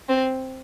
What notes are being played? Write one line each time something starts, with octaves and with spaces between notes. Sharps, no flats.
C4